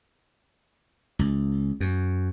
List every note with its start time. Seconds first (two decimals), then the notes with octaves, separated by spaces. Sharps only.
1.19 C#2
1.80 F#2